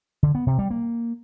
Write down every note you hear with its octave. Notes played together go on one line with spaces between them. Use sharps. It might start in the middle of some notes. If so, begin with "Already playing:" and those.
D3
B3
C3
G3
A#3